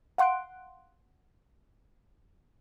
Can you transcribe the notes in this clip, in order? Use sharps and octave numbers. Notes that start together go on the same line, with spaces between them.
F5 F#5 C6 F#6 D7